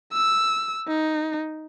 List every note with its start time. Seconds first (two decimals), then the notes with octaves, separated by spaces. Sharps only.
0.13 E6
0.88 D#4